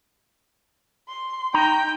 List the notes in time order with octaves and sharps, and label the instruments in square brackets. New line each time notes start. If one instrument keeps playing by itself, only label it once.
[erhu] C6
[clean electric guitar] D#4 A#5 [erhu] G5